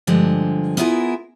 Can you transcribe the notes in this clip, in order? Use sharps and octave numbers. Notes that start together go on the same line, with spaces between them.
G2 D3 F3 G#3
B3 E4 F4 G#4 A#4